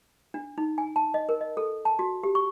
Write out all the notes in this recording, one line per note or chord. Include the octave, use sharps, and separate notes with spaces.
D4
D#4
G#5
A5
D#5
A#4
D#5
A4
A5
F#4
G4
C#6